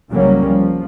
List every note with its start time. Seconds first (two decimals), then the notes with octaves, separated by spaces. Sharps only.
0.11 C2 C#3 F#3 G3 A#3 C#4
0.46 F3